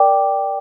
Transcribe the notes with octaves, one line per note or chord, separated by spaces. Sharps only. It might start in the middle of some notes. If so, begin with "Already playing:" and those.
Already playing: A#4 D5 G5 D6